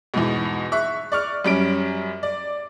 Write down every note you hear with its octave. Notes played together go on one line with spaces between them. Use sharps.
E2 G#2 B2
E5 C#6 F#6
D5 C#6 F6
F#2 G3 C#4 D7
D5